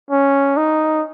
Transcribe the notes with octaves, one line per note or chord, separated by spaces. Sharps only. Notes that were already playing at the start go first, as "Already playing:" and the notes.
C#4
D#4